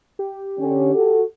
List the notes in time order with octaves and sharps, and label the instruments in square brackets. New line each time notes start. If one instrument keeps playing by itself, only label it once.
[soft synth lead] G4
[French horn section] D3 C#4
F#4 A4